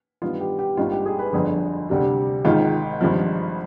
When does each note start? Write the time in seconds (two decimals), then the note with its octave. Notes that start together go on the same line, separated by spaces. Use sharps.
0.22 G2 D#3 B3 F4
0.41 G4
0.59 G4
0.77 G#1 G2 D#3 F4
0.92 G4
1.06 G#4
1.19 B4
1.33 G1 F2 D3 G#4
1.89 D2 C3 G3 D4
2.45 G#1 G#2 D#3 F4
3.01 G#1 G2 F3